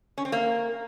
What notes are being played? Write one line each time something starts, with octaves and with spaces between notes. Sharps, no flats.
C#4
C4
A#3